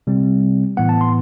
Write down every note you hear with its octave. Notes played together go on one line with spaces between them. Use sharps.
C3 G3 C4
A2 E3 B3 F#5
A5
C6